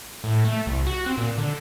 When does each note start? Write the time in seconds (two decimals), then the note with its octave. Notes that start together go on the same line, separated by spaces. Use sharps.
0.24 A2
0.45 A3
0.67 C2
0.87 F#4
1.06 C4
1.18 A#2
1.38 D3